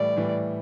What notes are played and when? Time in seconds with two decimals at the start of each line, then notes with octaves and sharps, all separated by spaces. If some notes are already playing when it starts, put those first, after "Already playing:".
Already playing: A2 E3 G3 D5
0.16 A2 E3 G3